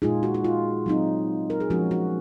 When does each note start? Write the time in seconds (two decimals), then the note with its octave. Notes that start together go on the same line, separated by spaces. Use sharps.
0.02 A#2 G#3 D#4 F4 G#4
0.23 F#4
0.35 F#4
0.45 F4
0.86 F#3 C4 D#4
1.50 A#4
1.60 G#4
1.70 F3 G#3 C#4 F#4
1.91 F#4